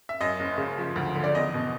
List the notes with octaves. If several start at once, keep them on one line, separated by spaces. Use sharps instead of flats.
E5
F#2 D#5
F#1
C#3
F3
D2
D3
D5
E2 D#5
B2